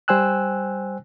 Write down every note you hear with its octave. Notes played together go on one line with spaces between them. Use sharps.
G3 C5 G5 G#5 E6 F#6